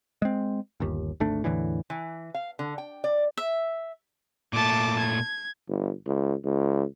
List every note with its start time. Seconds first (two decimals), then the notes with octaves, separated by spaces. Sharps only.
0.22 G#3 C4
0.80 G1 D#2
1.20 G#1 D2 A3 D4
1.44 E2 A2 D3 E3
1.90 E3
2.34 F5
2.59 D3
2.78 G5
3.04 D5
3.37 E5
4.53 A#2 A3 A5 D6
4.99 G#6
5.69 G1
6.06 C#2
6.44 C#2